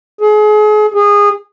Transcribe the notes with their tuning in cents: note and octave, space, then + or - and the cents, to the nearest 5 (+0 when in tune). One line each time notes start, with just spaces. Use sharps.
G#4 +35
G#4 -20